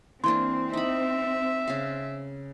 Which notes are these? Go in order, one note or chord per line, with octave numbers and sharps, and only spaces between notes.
E3 A#3 C4 D4 C6
D#4 E5 B5
C#3 F5